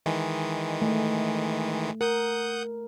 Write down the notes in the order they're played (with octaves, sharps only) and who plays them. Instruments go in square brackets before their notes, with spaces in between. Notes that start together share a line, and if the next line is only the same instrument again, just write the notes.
[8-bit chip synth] D#3 E3 G#3
[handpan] A3
[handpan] A#4 [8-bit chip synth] F#5 D#6 G6